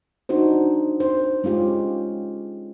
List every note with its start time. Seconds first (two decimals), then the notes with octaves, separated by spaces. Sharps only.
0.29 D4 D#4 F#4 C5
1.00 C5
1.44 G#3 C#4 F4 G4